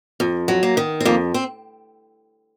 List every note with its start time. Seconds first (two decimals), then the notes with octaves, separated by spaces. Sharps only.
0.20 F2
0.48 F#3
0.63 A#3
0.77 D#3
1.01 C4
1.05 F2 A#3
1.34 C4